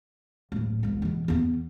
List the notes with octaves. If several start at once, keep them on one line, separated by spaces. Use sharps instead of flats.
D1 A2
E1 C2
E2 B2
E2 B3